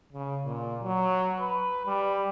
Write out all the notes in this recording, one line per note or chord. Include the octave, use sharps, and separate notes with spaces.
C#3
A#2
F#3
B4
G3